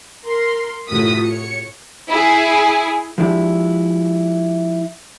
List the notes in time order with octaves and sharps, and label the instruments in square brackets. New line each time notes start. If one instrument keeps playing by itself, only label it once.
[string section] A#4 C6
A2 C3 F4 F#4 D#6 B6
C#5 C#7
E4 G#4
[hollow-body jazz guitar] F3 G#3 D4 E4 G4